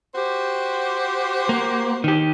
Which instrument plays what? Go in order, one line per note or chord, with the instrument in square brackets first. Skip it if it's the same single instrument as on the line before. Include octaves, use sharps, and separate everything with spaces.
[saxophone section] F#4 G4 C5
[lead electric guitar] A#3
D#3 G4